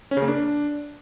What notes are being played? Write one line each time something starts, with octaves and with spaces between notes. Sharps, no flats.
C#4
C#3
A#3
D4